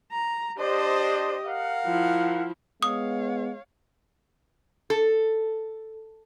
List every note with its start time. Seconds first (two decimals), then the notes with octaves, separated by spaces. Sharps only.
0.12 A#5
0.59 D4 G4 C5 D#5
1.46 A#4 F5 F#5
1.86 F3 E4
2.83 G#3 B3 C#5 F5 D#6
4.90 A4